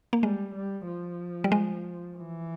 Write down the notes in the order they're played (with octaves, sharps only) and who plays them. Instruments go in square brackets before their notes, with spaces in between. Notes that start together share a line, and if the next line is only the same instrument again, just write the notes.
[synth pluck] A#3
[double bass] G3 [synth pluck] G#3
[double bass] G3
F3
[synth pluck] G3
G#3
[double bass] E3